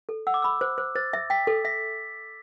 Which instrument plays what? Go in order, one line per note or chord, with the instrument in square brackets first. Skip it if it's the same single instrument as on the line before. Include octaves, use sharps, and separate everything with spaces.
[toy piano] A4
[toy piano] F#5 [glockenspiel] E6
[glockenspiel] D6
[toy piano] B5 [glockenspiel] E6
[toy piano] C5
C5
[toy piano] C5 [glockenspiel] A6
[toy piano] E5
[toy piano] G5 [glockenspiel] B6
[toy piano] A4
[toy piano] E5 [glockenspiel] B6